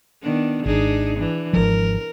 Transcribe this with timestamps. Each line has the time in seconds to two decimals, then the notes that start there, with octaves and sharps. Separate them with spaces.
0.22 D#3 B3 D4
0.66 G#1 D4 D#4 G#4
1.16 E3 D4
1.53 G#1 F3 A#4